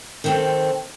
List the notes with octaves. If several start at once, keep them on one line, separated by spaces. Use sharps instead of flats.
D#3 C4 A4